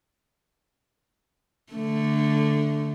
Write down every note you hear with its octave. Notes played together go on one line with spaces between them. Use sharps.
D3 A3